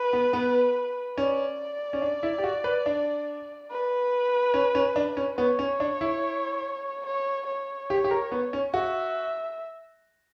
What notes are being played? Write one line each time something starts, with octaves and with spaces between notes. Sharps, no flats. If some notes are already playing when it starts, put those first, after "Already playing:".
Already playing: B4
B3
B3
C#4 D5
C#4
D4
E4
G4
F#4
B4
D4
B4
C#4
C#4
D4
C#4
B3 C#5
C#4
D4
E4
C#5
C#5
G4
G4
A#4
B3
C#4
F#4 E5